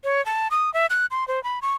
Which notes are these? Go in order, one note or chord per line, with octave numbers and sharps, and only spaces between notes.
C#5
A5
D#6
E5
F#6
C6
C5
B5
C#6